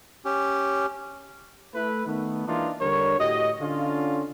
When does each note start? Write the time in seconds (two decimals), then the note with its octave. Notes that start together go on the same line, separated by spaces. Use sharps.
0.25 C#4 G4
1.75 A3 E4 B4
2.06 D#3 A3 B3
2.47 E3 G#3 A#3 D4 D#4 F4
2.81 D3 G3 A#4 C#5
3.19 A2 F#4 G4 D#5
3.61 D3 C#4 F4